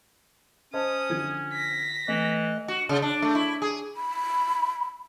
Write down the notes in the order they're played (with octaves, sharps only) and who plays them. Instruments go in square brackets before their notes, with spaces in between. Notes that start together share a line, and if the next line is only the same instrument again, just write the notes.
[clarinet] C#4 [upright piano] C5 D#5 A5 [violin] D#6
[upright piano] D3 F3 G#6
[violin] A#6 B6
[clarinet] E3 [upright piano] A3 [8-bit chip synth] D#5
[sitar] F#4
C#3
D4
A3
E4
G#4
[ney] B5